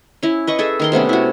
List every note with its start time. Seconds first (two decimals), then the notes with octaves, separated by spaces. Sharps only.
0.23 C#4 E4
0.47 B4 D#5 C#6
0.59 G#4 A4 E5
0.80 D#3 A#4 C6
0.92 C3 A3 B3 C#4
1.09 E4 F#4